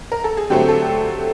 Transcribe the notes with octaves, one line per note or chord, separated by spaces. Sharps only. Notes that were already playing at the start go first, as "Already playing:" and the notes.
A#4
A4
G#4
D3 F#3 A3 C4 G4
A4